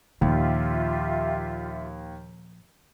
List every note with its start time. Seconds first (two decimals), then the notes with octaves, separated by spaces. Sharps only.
0.21 D#2 A#2 F3 F4 G4 E5